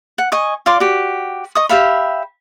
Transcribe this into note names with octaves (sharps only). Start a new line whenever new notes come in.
F#5
D#5 G#5 C#6
F4 D5 C6 D6
F#4 G4
D#5 C#6 D#6
G4 E5 F5 B5